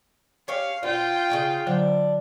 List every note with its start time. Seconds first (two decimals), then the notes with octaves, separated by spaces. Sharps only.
0.48 G4 C#5 F5 G#5
0.83 B2 C4 F4 D5 G5
1.30 C#3 C#4 G#5
1.67 D3 F#3 D4 C5